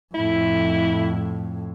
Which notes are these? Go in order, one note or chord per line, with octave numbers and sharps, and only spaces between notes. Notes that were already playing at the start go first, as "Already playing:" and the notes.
F2 A2 E4